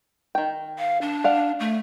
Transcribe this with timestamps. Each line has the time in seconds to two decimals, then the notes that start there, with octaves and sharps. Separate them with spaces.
0.35 D#3 G5
0.78 F5
1.02 D4
1.24 D5 F5 F#5
1.60 A3